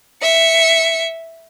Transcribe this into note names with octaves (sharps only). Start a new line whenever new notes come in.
E5 C#7